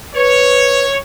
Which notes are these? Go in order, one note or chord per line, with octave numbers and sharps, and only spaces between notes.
B4 C#5